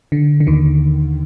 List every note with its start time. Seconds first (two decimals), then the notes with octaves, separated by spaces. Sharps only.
0.12 D3
0.40 D3
0.47 D#2 D#3